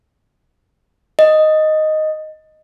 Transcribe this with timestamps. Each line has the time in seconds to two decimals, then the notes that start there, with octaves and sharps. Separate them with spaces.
1.19 D#5